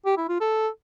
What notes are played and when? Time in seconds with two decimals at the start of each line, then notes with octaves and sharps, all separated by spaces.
0.06 G4
0.17 E4
0.29 F4
0.40 A4